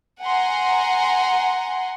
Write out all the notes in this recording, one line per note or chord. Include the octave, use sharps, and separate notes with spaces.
F#5 G#5 A#5 C6